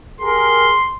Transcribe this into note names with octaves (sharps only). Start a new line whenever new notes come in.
G4 G#4 A#4 C6